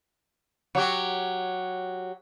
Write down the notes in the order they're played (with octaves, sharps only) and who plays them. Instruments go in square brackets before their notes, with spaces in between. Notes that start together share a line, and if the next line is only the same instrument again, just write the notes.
[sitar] F#3 G4